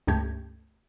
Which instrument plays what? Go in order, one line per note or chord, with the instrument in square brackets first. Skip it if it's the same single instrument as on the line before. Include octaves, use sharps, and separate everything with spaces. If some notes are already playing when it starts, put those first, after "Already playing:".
[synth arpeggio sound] C#2 G2 A3 G4 G#6